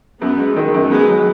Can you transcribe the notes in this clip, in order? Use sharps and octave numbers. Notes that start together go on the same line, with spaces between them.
F#2 B3
G#3
D#3
F#2
G#3 B3
F#3